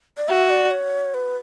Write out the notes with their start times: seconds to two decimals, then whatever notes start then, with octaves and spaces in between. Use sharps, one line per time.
0.17 D5
0.28 F#4 E5
0.50 D5
0.71 C#5
1.14 B4